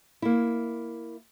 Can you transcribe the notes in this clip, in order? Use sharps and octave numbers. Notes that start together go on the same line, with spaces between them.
A#3 E4